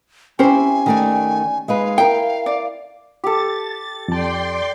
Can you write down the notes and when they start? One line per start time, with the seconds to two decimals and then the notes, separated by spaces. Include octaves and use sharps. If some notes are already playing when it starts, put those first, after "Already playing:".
0.39 C4 C#4 E4 G4 C5 G#5
0.86 D#3 A3 D5
1.68 G#3 D#4 B4 F5
1.98 E4 A#4 G5
2.46 D5
3.24 G4 A4 A6
4.08 F2 D5 G5 A5 C6